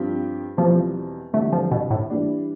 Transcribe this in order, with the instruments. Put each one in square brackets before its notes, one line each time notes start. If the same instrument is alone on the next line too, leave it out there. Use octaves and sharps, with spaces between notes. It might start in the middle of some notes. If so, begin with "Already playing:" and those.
Already playing: [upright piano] G2 F3 C4 G4
[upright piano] E2 B2 G3 C4 F4 [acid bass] F3
[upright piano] E2 D3 G3 C4 [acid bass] A3
[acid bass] F3
B2
A2
[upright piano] E3 G3 D4